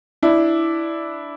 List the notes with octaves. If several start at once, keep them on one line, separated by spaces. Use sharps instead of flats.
D4 E4